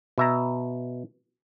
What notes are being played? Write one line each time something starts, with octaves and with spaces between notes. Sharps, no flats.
B2 E5 A#5